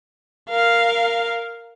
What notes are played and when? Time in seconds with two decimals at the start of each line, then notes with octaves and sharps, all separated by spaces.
0.50 A#4 F5